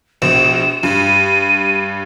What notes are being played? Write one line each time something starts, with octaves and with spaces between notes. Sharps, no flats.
A#1 B2 E7
G2 D#7